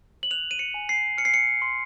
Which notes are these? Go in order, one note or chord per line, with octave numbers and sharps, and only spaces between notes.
F#7
F#6 F7
D#7
C#7
G#5
C7
F6 C#7
C7
C#7
C6